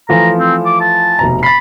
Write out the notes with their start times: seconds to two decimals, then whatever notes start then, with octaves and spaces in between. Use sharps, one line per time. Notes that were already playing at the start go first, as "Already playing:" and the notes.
0.09 E3 F3 A3 A#5
0.39 C4
0.66 D6
0.81 A5
1.19 F1 B2 A#5
1.43 B5 A6 C7